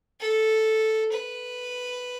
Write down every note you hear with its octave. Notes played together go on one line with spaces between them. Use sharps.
A4
B4